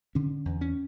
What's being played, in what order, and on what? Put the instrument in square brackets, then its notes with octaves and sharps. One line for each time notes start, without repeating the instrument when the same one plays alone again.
[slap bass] D3 C#4
E2
C#4